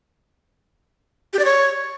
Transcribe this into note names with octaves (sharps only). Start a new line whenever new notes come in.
G4
D5
C#5